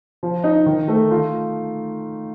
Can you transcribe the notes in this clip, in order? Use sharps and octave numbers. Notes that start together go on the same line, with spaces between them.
F3
D#4
D#3
A3
F4